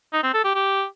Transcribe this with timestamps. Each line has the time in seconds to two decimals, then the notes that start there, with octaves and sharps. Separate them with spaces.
0.13 D#4
0.23 C4
0.34 A4
0.44 G4
0.55 G4